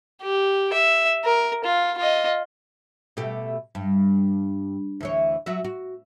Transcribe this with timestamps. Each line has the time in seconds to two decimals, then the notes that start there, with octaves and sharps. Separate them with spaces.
0.23 G4
0.73 E5
1.25 A#4
1.64 F4
1.98 F4 D#5
3.17 B2 A3 G4
3.75 G2
5.01 D2 E3 C#5
5.46 F#3 F#4 E5
5.64 F#4